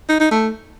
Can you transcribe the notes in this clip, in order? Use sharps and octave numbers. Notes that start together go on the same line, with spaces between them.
D#4
D#4
A3